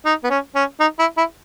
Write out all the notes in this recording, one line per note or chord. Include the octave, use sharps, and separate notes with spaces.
D#4
B3
C#4
C#4
D#4
E4
E4